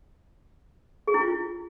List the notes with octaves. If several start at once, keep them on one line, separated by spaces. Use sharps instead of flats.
G#4
E4
F4